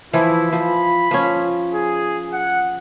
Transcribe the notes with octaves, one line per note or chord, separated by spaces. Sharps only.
E3 F3 E4
F3 B5
F3 C#4
G#4
F#5